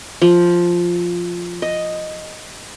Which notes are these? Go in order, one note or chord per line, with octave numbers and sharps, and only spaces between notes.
F3
D#5